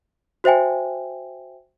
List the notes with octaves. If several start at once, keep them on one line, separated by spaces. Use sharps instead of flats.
F#4 C5 E5 G5 G#5